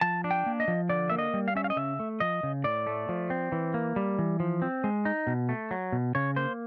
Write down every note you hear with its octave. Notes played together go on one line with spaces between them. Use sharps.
F3 A5
D4
G5
A#3
D#5
F3
D3 D5
A#3 E5
D#5
G3
F5
C#4 E5
F5
D#5
C#3 E5
A3
F3 D#5
C#3
A2 D5
A3
F3
C4
E3
A#3
G3
E3
F3
C4
G#3
D#4
B2
A3
F#3
B2
C#3 C#5
A#3 C5